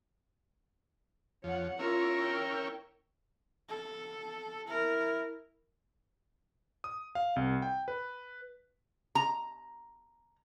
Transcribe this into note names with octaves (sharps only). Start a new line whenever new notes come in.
F2 F3 C#5 F#5
C#4 E4 F4 A#4 C#5
G5
A4
E4 A#4
D#6
F5
C2
G5
B4
A#5